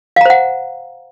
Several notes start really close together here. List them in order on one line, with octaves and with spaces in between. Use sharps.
F5 A#5 C5 F#5